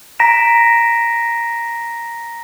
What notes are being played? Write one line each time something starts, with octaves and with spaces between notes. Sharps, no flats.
A#5 A#6 B6 D7 E7